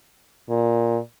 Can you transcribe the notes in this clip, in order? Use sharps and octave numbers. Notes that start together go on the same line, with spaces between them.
A#2